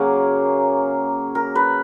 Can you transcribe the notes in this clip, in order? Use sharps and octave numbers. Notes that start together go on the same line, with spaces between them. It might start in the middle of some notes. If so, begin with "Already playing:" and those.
Already playing: C#3 F#3 A#3 G#4
A#4
B4